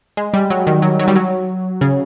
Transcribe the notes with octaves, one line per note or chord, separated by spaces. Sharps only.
G#3
G3
F#3
D#3
F#3
F#3
G3
F#3
C#3